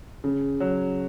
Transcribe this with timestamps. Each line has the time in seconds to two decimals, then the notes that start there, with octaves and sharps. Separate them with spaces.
0.24 C#3
0.60 F#3